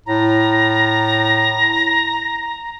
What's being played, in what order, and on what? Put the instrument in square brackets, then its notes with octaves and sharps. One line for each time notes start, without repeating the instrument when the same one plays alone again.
[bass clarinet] A2 [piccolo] A#5